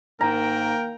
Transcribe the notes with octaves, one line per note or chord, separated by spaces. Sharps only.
G#2 D#3 A#3 A#4 G5 A#5